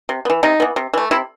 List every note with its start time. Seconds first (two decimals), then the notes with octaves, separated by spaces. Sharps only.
0.09 C3
0.25 B3
0.30 E3
0.43 C3 D#4
0.60 E3 B3
0.76 C3
0.94 E3 A3
1.11 C3 E4